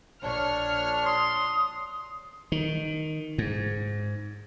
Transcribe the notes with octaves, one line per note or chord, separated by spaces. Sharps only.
A#1 D4 C#5 F6
C6 D#6
D#3
G#2